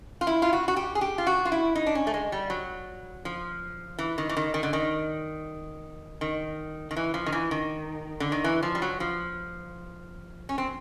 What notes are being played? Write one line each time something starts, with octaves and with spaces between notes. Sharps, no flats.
F4
E4
F4
F#4
F#4
G4
G#4
G4
F4
F#4
F4
E4
D#4
D4
C#4
A3
G#3
G3
F#3
F3
E3
D#3
E3
D#3
D#3
D3
D#3
D#3
D#3
E3
F3
D#3
E3
D#3
D3
D#3
E3
F3
G3
F#3
F3
C#4
C4